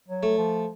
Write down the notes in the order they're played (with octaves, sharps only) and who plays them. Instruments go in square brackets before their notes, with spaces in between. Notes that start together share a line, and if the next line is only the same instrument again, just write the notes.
[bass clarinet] F#3
[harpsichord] A3
[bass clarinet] F3